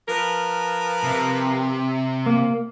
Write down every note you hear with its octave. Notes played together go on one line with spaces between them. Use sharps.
F3 A#4 B4
C3
A#3